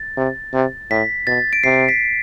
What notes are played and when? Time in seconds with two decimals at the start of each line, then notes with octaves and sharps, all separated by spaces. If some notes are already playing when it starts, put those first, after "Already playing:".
Already playing: A6
0.17 C3
0.53 C3
0.90 A2 B6
1.27 B2 A6
1.53 D7
1.64 C3 C7
1.89 B6